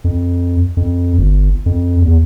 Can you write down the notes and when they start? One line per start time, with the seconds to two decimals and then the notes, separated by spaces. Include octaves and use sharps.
0.04 F2
0.77 F2
1.18 G1
1.66 F2
2.02 E2